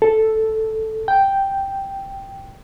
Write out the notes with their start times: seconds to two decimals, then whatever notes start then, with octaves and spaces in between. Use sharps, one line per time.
0.02 A4
1.08 G5